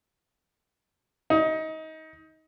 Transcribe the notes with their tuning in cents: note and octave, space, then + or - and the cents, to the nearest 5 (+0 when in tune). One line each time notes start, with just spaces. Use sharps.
D#4 +25